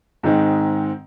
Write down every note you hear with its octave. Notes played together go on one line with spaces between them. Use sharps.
G#2 D#3 G#3 C4 D#4